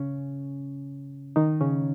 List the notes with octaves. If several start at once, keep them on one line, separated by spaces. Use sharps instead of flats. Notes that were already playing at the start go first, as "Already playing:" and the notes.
Already playing: C#3 C#4
D#3 D#4
C#3 C#4